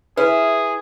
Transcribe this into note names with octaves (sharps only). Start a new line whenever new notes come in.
E4 G#4 B4